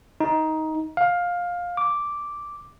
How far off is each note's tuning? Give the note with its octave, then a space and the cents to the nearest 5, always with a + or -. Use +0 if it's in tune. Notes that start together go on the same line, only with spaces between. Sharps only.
D#4 +15
F5 +15
D6 -5